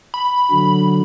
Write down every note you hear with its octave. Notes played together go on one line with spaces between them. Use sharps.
B5
D3 F#3